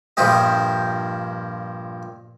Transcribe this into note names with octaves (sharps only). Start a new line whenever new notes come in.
A#1 G2 F3 G4 D#5